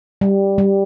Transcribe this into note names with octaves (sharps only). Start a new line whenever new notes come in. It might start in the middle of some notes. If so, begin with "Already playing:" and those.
G3
G3